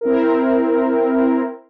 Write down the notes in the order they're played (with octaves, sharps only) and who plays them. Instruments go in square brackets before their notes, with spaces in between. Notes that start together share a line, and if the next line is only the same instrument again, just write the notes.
[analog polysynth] C4 E4 A#4